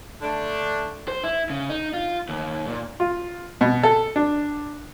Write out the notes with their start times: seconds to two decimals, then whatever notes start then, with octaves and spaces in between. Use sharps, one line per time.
0.22 D3 A3 D4
1.08 C5
1.24 E4
1.50 C#3
1.70 D#4
1.94 F4
2.29 D#2
2.68 A#2
3.00 F4
3.61 B2
3.83 A4
4.16 D4